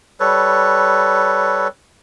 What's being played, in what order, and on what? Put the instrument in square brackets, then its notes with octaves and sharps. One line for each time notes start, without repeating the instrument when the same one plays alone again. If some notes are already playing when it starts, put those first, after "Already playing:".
[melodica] G3 A4 B4 C#5